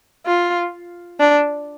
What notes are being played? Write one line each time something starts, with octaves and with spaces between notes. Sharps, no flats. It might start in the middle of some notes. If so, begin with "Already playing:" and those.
F4
D4